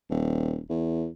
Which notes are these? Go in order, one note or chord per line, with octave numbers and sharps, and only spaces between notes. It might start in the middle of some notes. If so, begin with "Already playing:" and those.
D#1
E2